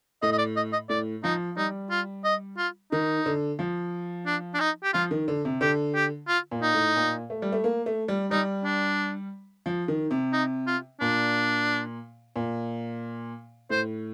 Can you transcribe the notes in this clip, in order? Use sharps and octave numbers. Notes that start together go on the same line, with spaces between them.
A2 D#5
D#5
D5
D#5
D#5
A2 D5
F3 D#4
G3 D#4
F4
D#5
F4
D#3 D#4
D3
F3
D4
D4
D#4
G4
F3 F4
D#3
D3
C3
D3 G4
G4
F4
A#2
D#4
A2
A#2
A3
G3
A3
A#3
A3
G3
G3 D#4
D4
F3
D#3
C3
D#4
F4
A#2 D4
A#2
A2 C5